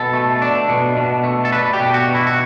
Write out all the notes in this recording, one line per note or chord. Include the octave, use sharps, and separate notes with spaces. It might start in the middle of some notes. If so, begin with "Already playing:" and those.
Already playing: B2 A4
A3
D4
B2
B2
A3
A4
D4 B4
G4
B2
F#4
B2
E4
F#4